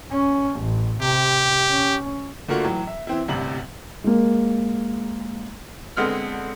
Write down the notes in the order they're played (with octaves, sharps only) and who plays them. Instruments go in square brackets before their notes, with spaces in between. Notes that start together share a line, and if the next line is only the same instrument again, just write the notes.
[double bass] C#4
A1
[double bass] C3 [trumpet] G4
[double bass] C#4
[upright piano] D3 A3 A#3 F4 F#4
A2 E3 F#3
E5
E3 C4 E4
A1 D2 G2 C3 F#7
[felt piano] G#3 A#3
[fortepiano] D3 G#3 B3 C4 F6